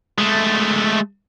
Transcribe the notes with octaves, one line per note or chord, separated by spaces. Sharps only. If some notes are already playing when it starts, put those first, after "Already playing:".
G#3 A3